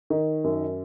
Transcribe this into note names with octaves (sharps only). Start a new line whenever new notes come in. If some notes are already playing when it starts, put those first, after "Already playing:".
D#3
F#2